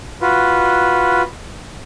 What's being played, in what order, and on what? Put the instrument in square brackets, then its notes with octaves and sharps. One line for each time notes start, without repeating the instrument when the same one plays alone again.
[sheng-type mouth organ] F4 F#4 B4